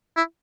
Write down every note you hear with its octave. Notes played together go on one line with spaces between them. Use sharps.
E4